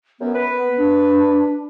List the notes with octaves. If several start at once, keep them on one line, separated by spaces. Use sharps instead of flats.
F#2 B3
B4
D4